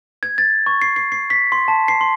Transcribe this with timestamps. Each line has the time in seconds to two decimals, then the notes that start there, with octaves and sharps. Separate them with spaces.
0.23 G#6
0.38 A6
0.66 C#6
0.82 C7
0.96 C7
1.12 C7
1.30 B6
1.52 C6
1.68 A5
1.88 C7
2.01 C6